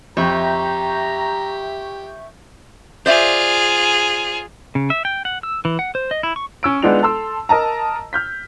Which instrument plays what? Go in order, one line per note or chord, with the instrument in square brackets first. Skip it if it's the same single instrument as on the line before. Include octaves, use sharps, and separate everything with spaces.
[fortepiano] F2 [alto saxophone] G4 [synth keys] E5 C#6 G6 [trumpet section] A#5
[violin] F4 G#4 [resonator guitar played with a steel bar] C5 D5 E5
[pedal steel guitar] C#3
E5
G5
F#5
E6
E3
F#5
C5
D#5
E4
C#6
[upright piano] C#4 E6 D7
G#3 B3 D4 D#4 F4 F7
A4 A5 C6 E6
A#4 D#5 A5 A#5
F6 G6 B6